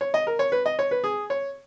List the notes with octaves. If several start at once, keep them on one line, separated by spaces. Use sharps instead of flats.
C#5
D#5
A#4
C#5
B4
D#5
C#5
B4
G#4
C#5